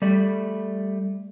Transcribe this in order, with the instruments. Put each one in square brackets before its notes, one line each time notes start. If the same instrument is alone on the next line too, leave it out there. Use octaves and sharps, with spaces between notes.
[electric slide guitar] G3 A3 D5